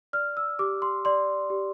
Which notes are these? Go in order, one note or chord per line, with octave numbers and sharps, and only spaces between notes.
D5 F6
E6
G4 D6
C6
D5 C6
G4